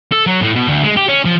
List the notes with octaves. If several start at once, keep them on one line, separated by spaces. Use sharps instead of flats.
A4
F#3
A2
B2
D2
G#3
G4
C#4
F3